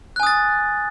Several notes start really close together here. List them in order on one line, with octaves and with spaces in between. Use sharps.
F#6 G#5 D#6 A6